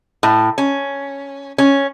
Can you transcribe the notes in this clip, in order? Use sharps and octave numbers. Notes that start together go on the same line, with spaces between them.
A2
C#4
C#4